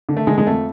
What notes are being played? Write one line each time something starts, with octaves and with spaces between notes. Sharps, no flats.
D3
A3
D3 G#3
G#3
F2 A3